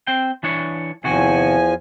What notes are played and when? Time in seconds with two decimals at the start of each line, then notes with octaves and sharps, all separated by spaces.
0.07 C4 G5
0.43 E3 D4 C#5
1.04 E2 C3 D#3 F3 F#4 G#5